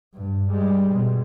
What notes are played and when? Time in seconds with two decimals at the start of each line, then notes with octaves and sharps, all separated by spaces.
0.14 G2
0.50 G3 G#3
0.93 B2